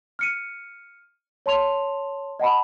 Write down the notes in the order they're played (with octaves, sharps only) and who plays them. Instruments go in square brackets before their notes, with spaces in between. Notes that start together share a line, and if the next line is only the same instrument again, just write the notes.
[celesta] F6 C#7 D#7
C#5 A5 C6 F7
D#5 F#5 A5 B5